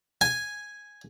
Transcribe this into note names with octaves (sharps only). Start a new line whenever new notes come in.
G#5